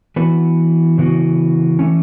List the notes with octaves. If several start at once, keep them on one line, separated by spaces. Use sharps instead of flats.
E3 B3 F#4 B4
C#3 E3 B3 F#4
E3 A3 C#4